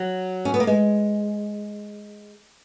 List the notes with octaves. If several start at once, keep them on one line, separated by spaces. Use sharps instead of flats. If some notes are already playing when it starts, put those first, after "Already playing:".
Already playing: F#3
C#4
B3
A#3
G#3